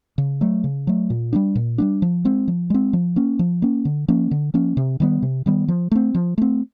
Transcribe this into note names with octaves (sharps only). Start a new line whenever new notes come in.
C#3
F#3 A3
C#3
F#3 A3
A#2
G3 A#3 D4
A#2
G3 A#3 D4
F3
G#3 C4
F3
G#3 C4
F3
A#3 C#4
F3
A#3 C#4
D3
F3 A#3 C#4
D3
F3 A#3 C#4
C3
D#3 G3 B3
C3
D#3 G3 B3
F3
A3 C4
F3
A3 C4